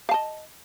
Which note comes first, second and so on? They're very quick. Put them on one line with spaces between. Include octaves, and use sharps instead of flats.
F5 A5 D#5